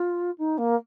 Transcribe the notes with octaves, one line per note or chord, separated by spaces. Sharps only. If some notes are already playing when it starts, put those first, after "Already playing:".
Already playing: F4
D#4
A#3